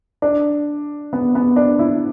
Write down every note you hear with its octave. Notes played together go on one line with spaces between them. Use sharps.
D4
B3
B3
D4
E4